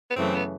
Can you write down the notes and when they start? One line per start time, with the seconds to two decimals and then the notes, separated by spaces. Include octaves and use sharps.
0.11 B3
0.16 F#2 C#3 E3 A3 C4
0.35 B3